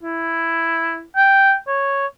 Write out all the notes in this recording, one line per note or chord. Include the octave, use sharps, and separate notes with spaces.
E4
G5
C#5